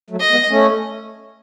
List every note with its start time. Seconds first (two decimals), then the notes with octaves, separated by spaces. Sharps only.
0.10 F#3 A3
0.20 D#5
0.30 G#3 B3
0.49 A3 C#4